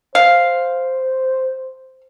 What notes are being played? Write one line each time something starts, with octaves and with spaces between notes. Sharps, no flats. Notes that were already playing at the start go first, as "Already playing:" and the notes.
C5 F5